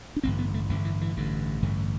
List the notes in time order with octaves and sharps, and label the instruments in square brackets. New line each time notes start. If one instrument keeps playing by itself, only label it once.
[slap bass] D4
A1 G2 D3 C4
B3
A3
A1 G2 D3 F3
E3
E3
A1 G2 D3
A1 G2 D3